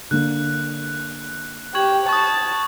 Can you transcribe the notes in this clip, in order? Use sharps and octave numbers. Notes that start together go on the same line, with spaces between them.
D3 A#3 F#6
G4 C#6 G#6 F#7
A5 C#6 D#6